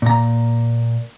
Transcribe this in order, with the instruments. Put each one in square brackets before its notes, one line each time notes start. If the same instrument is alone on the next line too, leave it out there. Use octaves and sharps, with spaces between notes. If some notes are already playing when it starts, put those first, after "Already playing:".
[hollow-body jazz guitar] A#2 A#5